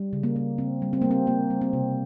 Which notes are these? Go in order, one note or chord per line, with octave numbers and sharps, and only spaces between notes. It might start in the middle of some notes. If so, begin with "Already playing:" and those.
Already playing: G3
C#3
A#3
A#3
C#3 C4
G3
C4
G3 A#3
C4
A#3
G3
C4
C3